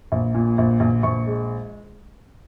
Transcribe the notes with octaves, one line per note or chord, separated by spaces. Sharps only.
A#1
A#2
A#1
A#1
A#1 C#6
G#3